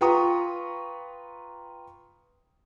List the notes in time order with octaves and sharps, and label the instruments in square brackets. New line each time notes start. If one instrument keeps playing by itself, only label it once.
[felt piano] F4 B4 G5 A#5 C#6 D#6